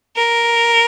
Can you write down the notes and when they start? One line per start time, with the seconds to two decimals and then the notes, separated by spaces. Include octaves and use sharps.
0.17 A#4